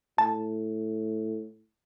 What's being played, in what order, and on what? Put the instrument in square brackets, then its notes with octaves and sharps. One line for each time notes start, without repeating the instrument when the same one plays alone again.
[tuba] A2 [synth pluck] A5